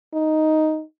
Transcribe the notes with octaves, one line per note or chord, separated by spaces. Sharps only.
D#4